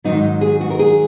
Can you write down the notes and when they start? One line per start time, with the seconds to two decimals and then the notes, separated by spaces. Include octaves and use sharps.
0.04 G#2 D#3 F#3 D#4
0.41 G#4
0.61 F#4
0.70 A#4
0.79 G#4